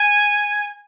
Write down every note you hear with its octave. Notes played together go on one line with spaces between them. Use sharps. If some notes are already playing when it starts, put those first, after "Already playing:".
Already playing: G#5